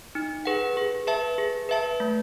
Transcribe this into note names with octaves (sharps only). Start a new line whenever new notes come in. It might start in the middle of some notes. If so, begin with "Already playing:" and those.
D#4
G#4 B4 F#5
G#4
B4 E5 A5
G#4
B4 E5 A5
A3